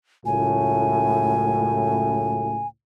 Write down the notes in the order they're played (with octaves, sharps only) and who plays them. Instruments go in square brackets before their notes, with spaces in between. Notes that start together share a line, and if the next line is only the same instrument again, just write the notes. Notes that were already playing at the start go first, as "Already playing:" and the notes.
[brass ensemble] C#2 F#2 A2 [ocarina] G#5